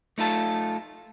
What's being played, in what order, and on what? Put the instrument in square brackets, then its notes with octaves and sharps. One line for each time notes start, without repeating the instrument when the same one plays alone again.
[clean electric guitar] A3 D#4 F4 A4